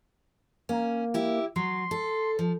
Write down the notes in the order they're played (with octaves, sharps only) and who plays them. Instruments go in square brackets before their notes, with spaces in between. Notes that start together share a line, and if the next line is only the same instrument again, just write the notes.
[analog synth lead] A#3 [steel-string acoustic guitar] C#4
[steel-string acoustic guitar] E4 G4
[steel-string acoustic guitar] F#3 [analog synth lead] C6
[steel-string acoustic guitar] A4
F3